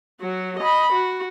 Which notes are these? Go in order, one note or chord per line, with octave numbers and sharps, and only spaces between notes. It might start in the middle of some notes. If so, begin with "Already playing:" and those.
F#3 F#4
D#5 B5
F#4